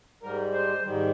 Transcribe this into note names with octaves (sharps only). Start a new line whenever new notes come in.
G#2 G3 A#4
C5
G#2 D#3 G3